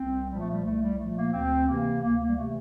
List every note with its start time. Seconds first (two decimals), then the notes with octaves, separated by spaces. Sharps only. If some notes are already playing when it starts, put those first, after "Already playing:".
Already playing: C2 C4
0.28 A#2 F3 G3
0.40 A3
0.50 G3
0.63 C2 A3
0.81 G3
0.98 A#2 F3 A3
1.15 A#3
1.32 D2 C4
1.67 C3 E3 A#3
2.01 D2 A#3
2.19 A#3
2.29 G3
2.36 C3 E3 A3